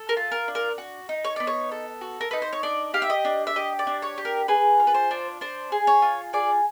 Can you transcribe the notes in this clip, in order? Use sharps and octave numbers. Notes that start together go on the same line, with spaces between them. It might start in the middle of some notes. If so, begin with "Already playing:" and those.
Already playing: A4
A#4
F4
A#4
D4
A#4
F#4
D#4
C#5
B3 D5
C#5
A4
F#4
A#4
D#4 B4
C5
C#5
D4 D5
G4 F5
E5
D#5
D4
E5
G4 D#5
D5
D4
C#5
G4
A#4
G#4 B4
F4
B4
C5
D4
D4 C5
G#4
C#5
F4
G#4 D5